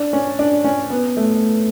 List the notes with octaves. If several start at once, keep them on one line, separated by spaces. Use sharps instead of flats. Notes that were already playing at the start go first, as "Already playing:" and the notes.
Already playing: D4
C#4
D4
C#4
B3
A3